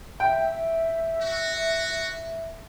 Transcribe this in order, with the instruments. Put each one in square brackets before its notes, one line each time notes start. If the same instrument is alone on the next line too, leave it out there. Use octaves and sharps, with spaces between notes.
[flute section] E5 [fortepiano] G5
[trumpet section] F#4